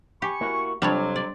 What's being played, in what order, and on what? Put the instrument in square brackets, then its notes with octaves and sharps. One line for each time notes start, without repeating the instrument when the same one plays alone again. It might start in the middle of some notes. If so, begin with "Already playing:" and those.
[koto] G4 [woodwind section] G#5 B5 C#6
[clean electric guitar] A#3 E4 F#4
[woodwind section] F2 F#3 [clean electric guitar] C3 F4 [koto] G3 D4 C#5
[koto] D5